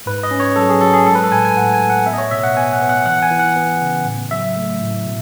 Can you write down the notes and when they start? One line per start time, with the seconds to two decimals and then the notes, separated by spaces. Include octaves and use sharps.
0.06 G#2 B4
0.23 D#5
0.31 C#4
0.40 C#5
0.56 F#3 A4
0.69 G#4
0.81 F#3 A4
0.94 G#4
1.06 G#3 A4
1.15 B4
1.24 A4
1.31 A2 G#5
1.45 G#5
1.56 A2 F#5
1.74 G#5
1.81 A2
1.90 F#5
2.06 B3 E5
2.13 D#5
2.18 C#5
2.31 B2 E5
2.43 F#5
2.56 B3 G#5
2.73 F#5
2.81 B3
2.89 F#5
3.06 E3 F#5
3.22 G#5
3.31 E3
3.39 F#5
3.56 B3
3.81 C#3
4.06 A2
4.31 F#3 E5
4.56 A3
4.81 A2
5.07 B2